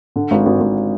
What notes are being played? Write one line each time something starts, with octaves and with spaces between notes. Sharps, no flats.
D3
G#1
G#1
G#1